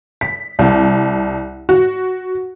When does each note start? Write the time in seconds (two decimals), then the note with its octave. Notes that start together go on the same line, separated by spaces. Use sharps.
0.21 B6
0.59 C2
1.69 F#4